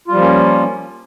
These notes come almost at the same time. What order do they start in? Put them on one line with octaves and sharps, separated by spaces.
F4 G3 F3 A#3 C#4